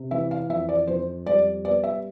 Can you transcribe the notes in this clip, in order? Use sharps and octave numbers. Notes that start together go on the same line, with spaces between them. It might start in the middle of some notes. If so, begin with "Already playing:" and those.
Already playing: C3
E3 E5
F5
F2 E5
D5
F2 C5
G3 D5
B3 D5
E5